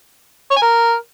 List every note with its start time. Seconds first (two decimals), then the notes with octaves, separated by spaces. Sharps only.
0.51 C#5
0.57 G#5
0.62 A#4